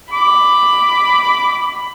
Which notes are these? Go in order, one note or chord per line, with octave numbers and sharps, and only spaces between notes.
B5 D6